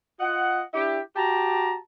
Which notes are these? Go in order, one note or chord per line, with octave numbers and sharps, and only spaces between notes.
F4 D#5 F#5
D4 E4 G4
F#4 G4 A5 A#5